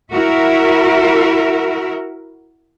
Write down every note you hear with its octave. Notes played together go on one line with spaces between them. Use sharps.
E4 F#4 A#4 E5